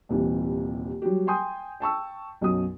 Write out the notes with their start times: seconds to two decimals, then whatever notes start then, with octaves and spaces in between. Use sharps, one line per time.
0.09 D#1 D#2 C3 E3
1.02 F#3 G3 F#4 G4
1.27 G5 G#5 C6 D#6 G6
1.80 G5 A5 C#6 E6
2.41 B1 F#2 F#3 D#6